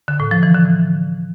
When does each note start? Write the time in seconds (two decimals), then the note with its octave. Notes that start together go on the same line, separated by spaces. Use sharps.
0.08 D3
0.20 A2
0.31 F3
0.43 E3
0.55 D3